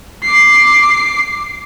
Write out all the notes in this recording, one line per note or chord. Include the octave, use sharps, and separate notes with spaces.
D6 C7